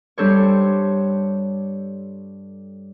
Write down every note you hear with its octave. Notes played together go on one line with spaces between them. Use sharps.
G2 G3 D4 A4 C5 C#5